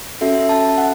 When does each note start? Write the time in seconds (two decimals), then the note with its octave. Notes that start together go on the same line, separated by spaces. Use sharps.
0.21 C#4 F#4 A4 E5
0.35 E5
0.49 A5
0.78 F#5